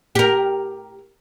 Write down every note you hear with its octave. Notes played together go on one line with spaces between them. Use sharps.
G4 A#4